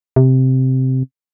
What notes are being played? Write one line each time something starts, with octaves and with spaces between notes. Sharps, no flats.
C3